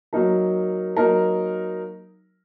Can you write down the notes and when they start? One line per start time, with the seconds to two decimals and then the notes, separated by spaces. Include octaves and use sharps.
0.13 F#3 A#3 D#4 A#4
0.97 F#3 A#3 D#4 A#4